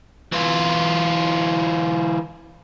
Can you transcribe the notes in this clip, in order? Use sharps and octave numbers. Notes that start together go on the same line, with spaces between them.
E3 F4